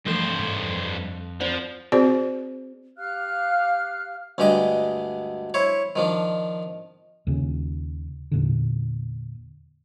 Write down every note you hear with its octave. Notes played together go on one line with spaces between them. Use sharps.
G2 E3 F3 A3 A4 C5 E7
G#2
F2
F3 C4 C5 D5
C4 F#4 G#4 C5 D5
G4 F5 F6 F#6
D2 G2 G#3 G4 D#5
E4 C5 C#5
D#3 F3 D4
D#2 C#3
E2 A#2 D3